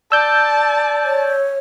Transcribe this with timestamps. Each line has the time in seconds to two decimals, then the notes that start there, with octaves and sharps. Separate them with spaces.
0.12 D5 A5 E6 G6
1.04 C#5